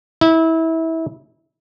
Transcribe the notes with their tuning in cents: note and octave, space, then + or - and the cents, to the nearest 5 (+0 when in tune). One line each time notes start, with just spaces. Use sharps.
E4 -25